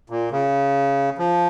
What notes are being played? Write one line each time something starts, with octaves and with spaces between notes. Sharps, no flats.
A#2
C#3
F3